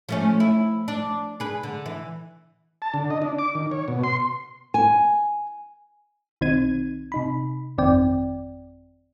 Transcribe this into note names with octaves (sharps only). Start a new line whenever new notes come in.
F3 A3 C#4
E4
D4
G#4 B4
D3
E3
A5
D3
D#5
D4
D6
D#3
C#5
B2
C6
G#5
B1 D#3 C4 D#4 G#6 D#7
C3 D#4 B5
G1 F2 D#3 C4 D5 G5